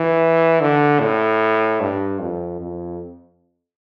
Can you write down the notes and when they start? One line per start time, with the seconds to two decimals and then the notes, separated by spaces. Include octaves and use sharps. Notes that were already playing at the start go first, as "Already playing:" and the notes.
Already playing: E3
0.61 D3
1.00 A2
1.81 G2
2.19 F2
2.60 F2